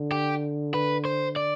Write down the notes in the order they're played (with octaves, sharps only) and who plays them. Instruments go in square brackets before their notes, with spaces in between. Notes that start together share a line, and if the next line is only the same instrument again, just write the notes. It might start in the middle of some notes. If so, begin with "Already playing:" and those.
Already playing: [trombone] D3
[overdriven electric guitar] G4
B4
C5
D5